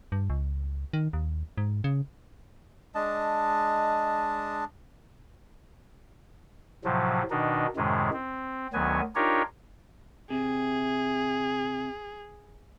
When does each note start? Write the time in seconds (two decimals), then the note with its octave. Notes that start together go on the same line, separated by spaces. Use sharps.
0.12 G2
0.30 C#2
0.93 D#3
1.13 D#2
1.58 G#2
1.84 C#3
2.95 G#3 D4 D#5 A5
6.84 A2 C3 F3 F#3
7.30 B2 D#3 D4 D#4
7.76 F#2 A2 C3 D#3 G#3
8.13 C4
8.73 D2 D#3 F#3 B3 G#5
9.15 D4 D#4 F4 G4 A#4 C#5
10.30 C3 G#4